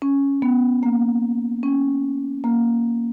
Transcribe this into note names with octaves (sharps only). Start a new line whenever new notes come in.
C#4
B3
A#3
C#4
A#3